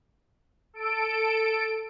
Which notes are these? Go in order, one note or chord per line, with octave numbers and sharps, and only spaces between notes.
A4 D7